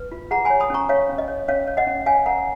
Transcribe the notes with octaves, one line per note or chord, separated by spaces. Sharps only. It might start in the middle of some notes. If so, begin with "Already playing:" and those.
Already playing: B4
F4
G#4 F#5 A#5
G#5 B5
C#5
B5 D#6
C#4 A#5 C#6
C#5 F5
C#4
D#5
C#5
C#4 C#5 F5
C#5
D#5 F#5
C#4
C#5 F5 G#5
A#4 F#5 A#5